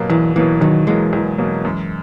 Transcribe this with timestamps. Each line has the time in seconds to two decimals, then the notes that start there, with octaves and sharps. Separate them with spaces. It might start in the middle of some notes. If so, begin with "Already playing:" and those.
Already playing: B2 F#3 A#3
0.10 E2 E3
0.36 B2 E3 F#3 A#3
0.61 E2 D#3 F#3
0.87 B2 E3 F#3 G#3 A#3
1.13 E2
1.38 B2 F#3 A#3
1.65 F#2